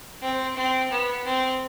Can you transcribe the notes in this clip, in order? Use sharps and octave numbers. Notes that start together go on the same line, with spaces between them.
C4
C4
B3
C4